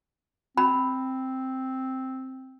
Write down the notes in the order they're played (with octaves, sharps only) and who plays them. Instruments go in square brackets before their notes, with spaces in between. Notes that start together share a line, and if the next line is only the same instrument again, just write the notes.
[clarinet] C4 [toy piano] B5